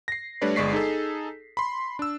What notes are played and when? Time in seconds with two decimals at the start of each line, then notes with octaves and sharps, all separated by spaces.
0.08 A#6 C7
0.42 G3 A3 D4 B4 C#5 D5
0.56 G1 G#3 D5 C#6 B6 C7
0.73 D#4 G#4 A4
1.57 B5 C6
1.99 D4 E6